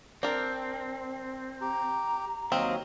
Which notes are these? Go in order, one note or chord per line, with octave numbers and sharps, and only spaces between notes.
C4 D4 A#4
G4 A#5
D#2 F#3 C4 D#5 F5